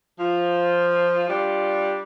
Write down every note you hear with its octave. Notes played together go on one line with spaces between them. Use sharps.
F3
G3 D4 F4